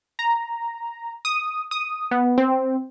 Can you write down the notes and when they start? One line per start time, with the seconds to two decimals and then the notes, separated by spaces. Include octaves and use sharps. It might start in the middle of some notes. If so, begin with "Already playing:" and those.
0.19 A#5
1.25 D#6
1.71 D#6
2.11 B3
2.38 C4